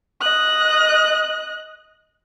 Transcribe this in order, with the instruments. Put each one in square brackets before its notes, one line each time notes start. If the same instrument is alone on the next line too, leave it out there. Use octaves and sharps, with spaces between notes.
[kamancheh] D#5 F#6